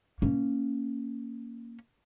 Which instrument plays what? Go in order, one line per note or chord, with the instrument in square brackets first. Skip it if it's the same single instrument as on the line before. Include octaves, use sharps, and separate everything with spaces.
[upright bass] A#3 C#4